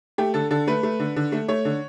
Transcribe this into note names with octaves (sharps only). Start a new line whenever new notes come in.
A3 G4
D3 A4
D3 A4
A3 B4
A3
D3
D3
A3
A3 C#5
D3